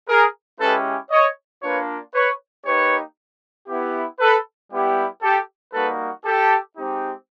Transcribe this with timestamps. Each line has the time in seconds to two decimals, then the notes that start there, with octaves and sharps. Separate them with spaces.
0.09 G#4 A#4
0.60 G#3 C#4 E4 G4 A4 B4
1.11 C#5 D#5
1.63 A#3 D4 F4 B4 C#5
2.14 B4 C#5
2.65 A#3 D#4 G4 B4 C#5
3.68 B3 E4 G4
4.20 A4 B4
4.71 G3 B3 E4 G4
5.22 G4 A4
5.74 G3 A#3 D#4 F#4 A4 B4
6.25 G4 A4
6.77 G#3 C4 D#4 G4